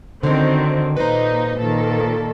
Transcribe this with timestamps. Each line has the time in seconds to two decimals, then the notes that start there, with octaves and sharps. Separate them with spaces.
0.23 D3 D#3 C4 C#4 F#4
0.97 A#2 D#4 B4 C5
1.59 A#2 D#3 A4